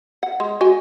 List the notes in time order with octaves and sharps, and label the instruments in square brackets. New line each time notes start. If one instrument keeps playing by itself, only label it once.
[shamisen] F#5
G#3
F#4 D#5 G#5